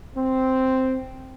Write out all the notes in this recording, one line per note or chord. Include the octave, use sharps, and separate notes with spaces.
C4